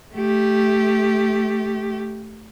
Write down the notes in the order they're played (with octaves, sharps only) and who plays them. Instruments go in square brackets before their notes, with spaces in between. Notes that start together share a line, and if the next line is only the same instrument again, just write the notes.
[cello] A3 G4